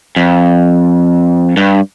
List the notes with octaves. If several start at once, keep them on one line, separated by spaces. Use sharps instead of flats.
F2
G2